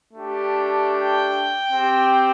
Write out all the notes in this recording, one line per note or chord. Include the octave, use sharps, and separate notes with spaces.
A3 D4 G4
G5
C4 G4